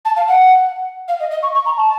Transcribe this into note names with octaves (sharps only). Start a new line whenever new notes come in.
A5
F5
F#5
F5
D#5
D#5
C#6
C#6
A#5
A5